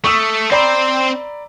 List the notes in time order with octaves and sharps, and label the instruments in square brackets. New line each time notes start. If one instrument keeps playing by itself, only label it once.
[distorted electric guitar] A3 [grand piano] C#6 D#6 E6
[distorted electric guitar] C4 C5 [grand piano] D5 A#5 B5